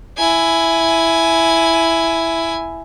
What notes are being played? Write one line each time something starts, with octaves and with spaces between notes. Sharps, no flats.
E4 G#5